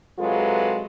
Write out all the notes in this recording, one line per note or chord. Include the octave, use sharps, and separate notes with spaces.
C3 F#3 G#3 F4 A4 B4